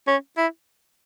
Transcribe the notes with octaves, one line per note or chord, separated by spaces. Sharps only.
C#4
E4